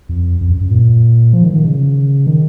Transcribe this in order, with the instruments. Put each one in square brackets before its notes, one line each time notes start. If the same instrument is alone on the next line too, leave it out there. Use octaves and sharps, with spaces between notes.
[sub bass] F2
F2
F#2
F#2
A#2
F3
D#3
D#3
C#3
D#3